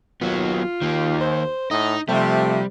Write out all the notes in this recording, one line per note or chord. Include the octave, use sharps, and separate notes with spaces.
D#2 F#3 B3 F4
D#2 D#3 A#3
C5
A2 D#4 D#5
C3 F3 G3 A3 C5